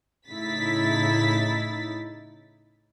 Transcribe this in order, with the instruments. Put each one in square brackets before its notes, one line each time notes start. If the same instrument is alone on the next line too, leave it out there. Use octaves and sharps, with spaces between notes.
[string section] A2 C#3 D#4 E4 A6 B6